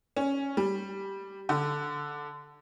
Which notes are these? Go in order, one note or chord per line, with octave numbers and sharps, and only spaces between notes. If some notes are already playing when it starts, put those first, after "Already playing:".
C#4
G3
D3